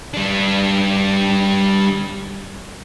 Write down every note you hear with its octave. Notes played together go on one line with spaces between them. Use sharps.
G3 D4